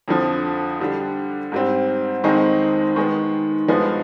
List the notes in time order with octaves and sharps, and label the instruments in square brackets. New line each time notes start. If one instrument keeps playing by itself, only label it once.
[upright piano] F2 D3 F3
D3 G3 D4
G#2 G3 C4
F2 D#3 G#3 C4 D#4
D#3 G#3 B3
G2 F3 G#3 B3